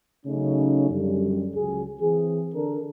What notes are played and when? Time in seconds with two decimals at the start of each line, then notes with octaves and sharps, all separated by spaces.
0.26 C#3 F#3 A3 C#4 D#4
0.90 F#2 D3 G3
1.54 C#2 F#3 G#4
2.00 E3 C4 G#4
2.54 D3 D4 A4 A#4